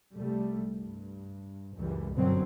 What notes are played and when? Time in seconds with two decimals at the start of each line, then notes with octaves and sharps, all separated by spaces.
0.15 C2 G3 A3
0.75 G2
1.76 C#2 F#2 E3 G3
2.14 G1 F#2 B2 D3 F#3 C4